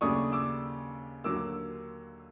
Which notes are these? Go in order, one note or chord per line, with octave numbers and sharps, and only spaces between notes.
D#2 C#3 F#3 A3 D4 C#6 D#6
D6 E6
D#2 D3 F#3 A#3 D6 E6